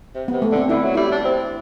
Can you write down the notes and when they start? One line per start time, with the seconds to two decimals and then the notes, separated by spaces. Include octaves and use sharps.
0.15 C3
0.28 C3 B3
0.42 A3
0.51 D3 C4
0.69 D3 E4
0.83 F#3
0.95 G3 E4
1.11 D4
1.25 C4